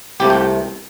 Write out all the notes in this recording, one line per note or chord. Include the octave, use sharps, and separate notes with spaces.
C2 C3 A3 G4
G5